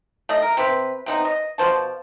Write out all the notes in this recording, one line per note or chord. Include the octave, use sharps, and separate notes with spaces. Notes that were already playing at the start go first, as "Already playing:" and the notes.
A3 D#5
A#4
C3 C4 B4
C3 B3 D#4
D#5
B2 F3 C5 A5